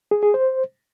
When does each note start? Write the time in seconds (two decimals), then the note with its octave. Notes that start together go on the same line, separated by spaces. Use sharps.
0.11 G#4
0.23 G#4
0.34 C5